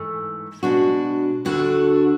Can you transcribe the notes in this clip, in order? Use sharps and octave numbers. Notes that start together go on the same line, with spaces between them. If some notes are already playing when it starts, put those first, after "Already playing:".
Already playing: G#2 E3 A3
B2 G#3 D4 F#4
D2 D3 A3 D4 F#4